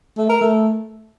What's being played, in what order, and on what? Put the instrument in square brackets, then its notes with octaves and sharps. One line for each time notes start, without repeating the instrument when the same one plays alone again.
[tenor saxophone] A3
A#4
A3